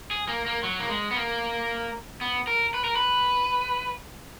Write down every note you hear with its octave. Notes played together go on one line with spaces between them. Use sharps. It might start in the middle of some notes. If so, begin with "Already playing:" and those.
G#4
A#3
A#3
F#3
A#3
G#3
B3
A#3
B3
A#4
B4
A#4
B4